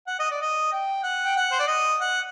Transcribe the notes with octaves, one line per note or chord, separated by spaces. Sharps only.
F#5
D#5
D5
D#5
G5
F#5
G5
F#5
C5
D5
D#5
F#5